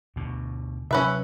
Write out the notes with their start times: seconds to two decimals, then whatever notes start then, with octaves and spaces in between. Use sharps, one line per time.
0.16 D2 B2
0.91 C3 F#3 C#4 B4 E5